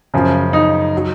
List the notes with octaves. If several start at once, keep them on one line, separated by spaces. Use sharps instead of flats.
F#2 C#3 F3
D#4
F#3